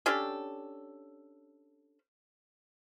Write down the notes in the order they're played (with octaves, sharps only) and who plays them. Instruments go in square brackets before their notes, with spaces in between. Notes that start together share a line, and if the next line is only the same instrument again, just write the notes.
[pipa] C#4 D4 G4 A4